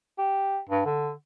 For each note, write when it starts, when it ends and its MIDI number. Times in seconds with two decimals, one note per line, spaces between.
0.19 0.59 67
0.69 0.83 43
0.85 1.10 50